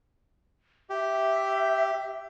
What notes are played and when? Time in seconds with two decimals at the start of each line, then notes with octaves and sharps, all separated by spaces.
0.90 G4 E5